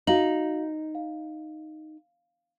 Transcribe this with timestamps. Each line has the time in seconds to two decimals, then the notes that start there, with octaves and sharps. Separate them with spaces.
0.07 D#4 F#4 F5 F#7
0.95 F5